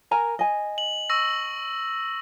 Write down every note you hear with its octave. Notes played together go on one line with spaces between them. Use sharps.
A#4 G#5 A#5
D#5 G#5
F#7
C#6 E6 A#6